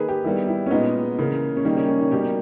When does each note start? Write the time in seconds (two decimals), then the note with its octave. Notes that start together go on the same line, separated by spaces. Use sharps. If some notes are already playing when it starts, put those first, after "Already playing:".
Already playing: D#3 A#3 G#4 B4
0.09 G4
0.24 D#3 G3 B3 E4
0.48 E4
0.66 C#4
0.71 A#2 G#3 B3 D#4
1.19 C#3 E3 A#3
1.57 C#4
1.65 D#3 G3 A#3 D#4
1.77 C#4
1.88 C#4
1.99 D#4
2.11 B2 G3 A#3 G4